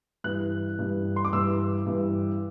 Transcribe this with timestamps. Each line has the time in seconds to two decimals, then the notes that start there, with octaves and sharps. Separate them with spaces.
0.24 G2 E3 F#6
0.79 G2 E3
1.16 C6
1.25 D6
1.33 G2 E3 E6
1.86 G2 E3